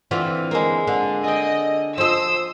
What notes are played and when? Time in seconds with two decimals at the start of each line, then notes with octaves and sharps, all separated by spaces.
0.11 D3 E3 C4 F4
0.51 G#3 A#3
0.87 D3
1.24 G#4 D#5 G5
1.98 F3 D#5 C6 D#6 E6